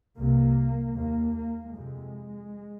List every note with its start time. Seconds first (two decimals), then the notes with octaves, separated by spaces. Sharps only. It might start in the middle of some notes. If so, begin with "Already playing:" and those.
0.18 C2 C3 A#3
0.96 D#2 A#3
1.35 A#3
1.74 F2 C3 G#3